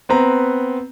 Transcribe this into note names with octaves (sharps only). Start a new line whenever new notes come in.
B3 C4 B4 A#5 B5